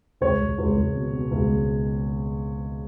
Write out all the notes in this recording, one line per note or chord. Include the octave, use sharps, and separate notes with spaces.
C#2 C#5
C#2
C#2
C#2
B2
B2
C#2
G#3